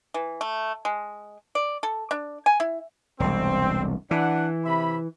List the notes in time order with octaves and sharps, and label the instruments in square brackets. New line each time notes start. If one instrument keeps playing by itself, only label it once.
[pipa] E3
A3
G#3
D5
A4
D4
G#5
E4
[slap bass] E1 C2 [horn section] C4
[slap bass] E3 [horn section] D4 F#5
[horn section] C3 E5 B5